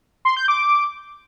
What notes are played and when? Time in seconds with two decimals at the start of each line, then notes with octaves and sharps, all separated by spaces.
0.25 C6
0.37 G6
0.48 D6